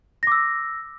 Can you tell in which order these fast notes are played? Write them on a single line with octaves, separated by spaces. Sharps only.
A#6 D6 E6